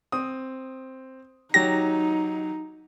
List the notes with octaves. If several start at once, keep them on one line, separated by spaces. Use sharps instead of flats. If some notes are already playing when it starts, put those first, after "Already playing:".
C4 D#6
F#3 D#4 G4 A#6